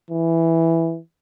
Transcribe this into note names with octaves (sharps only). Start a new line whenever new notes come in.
E3